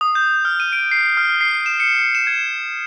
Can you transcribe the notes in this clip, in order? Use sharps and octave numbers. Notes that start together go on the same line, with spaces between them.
D#6
G6
F6
D#7
D7
C7
F6
C7
E7
C#7
E7
G#6